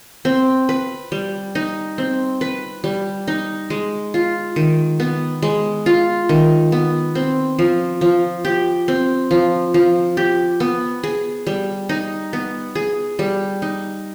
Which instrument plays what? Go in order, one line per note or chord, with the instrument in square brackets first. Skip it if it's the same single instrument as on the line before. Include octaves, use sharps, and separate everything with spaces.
[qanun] C4
B4
G3
D#4
C4
B4
G3
D#4
G#3
F4
D#3
B3
G#3
F4
D#3
B3
C4
F3
F3
G4
C4
F3
F3
G4
B3
G#4
G3
D#4
B3
G#4
G3
D#4